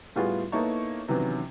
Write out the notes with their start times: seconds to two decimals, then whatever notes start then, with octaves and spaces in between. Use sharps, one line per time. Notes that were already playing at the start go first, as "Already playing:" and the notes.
0.16 A2 G3 B3 F4 F#4 G#4
0.52 A#3 B3 D#4 E4 A4 C#5
1.08 C3 D#3 E3 F#3 B3 C#4